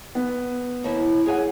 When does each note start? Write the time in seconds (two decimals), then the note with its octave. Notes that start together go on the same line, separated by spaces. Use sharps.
0.15 B3
0.84 D#2 E4
1.26 G#4 C#5 F#5 G#5